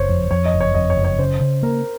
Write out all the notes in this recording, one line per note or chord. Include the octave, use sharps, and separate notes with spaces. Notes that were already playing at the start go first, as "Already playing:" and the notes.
Already playing: F#1 C5 C#5
F2
F2 C#5
D#5
F#1
C#5
F2 D#5
C#5
F#1
C#5
C#3 C5
C#3
A#3 A#4